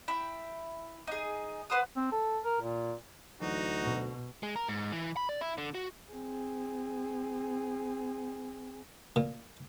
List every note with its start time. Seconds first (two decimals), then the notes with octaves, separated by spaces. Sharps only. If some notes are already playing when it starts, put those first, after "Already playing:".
0.08 E4 G5
1.07 D#4 G#4
1.70 B4 C5 F#5 D#6
1.96 C4
2.11 A4
2.44 A#4
2.61 A#2
3.41 D2 E3 F#3 D#4 F#4
3.83 B2
4.43 G#3
4.56 A#4
4.68 G#2
4.92 E3
5.17 B5
5.29 D5
5.41 E4
5.58 D3
5.75 F#4
6.12 C4 G#4
9.16 A#2